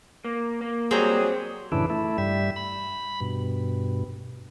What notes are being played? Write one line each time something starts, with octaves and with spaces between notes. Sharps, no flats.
A#3
A#3
F#3 G3 C4 G#4 A#5
F#2 A2 C#3 E3 D4 E4
A3 E4
G2 G3 E5
B5
G2 B2